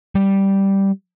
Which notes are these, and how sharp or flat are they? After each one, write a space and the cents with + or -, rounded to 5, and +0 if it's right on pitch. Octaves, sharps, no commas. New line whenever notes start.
G3 -5